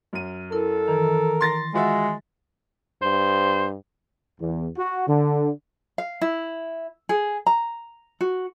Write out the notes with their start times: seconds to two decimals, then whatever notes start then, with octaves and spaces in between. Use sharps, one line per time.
0.13 F#2 D#7
0.52 E4 A4 A#4
0.88 D#3 E3 A#4
1.41 C6 A6 A#6
1.74 G#3 F4 F#4 E5
3.02 G2 C5
4.40 E2
4.77 F#4
5.07 D3
5.98 F5
6.21 E4
7.09 G#4
7.47 A#5
8.21 F#4